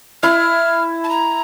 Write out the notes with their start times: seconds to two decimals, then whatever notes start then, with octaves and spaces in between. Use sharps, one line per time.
0.23 E4 F6
1.04 A5
1.09 A#5